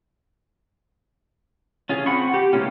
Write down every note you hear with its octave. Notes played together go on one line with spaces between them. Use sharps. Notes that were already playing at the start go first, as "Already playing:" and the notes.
C#4 F4 G#4
C4 F#5 B5 C#6
G4
E3 G#3 A#3 C#4 F4